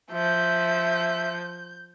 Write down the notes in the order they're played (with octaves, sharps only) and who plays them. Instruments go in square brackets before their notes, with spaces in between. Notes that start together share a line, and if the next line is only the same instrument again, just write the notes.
[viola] F3 [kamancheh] E5 [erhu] G6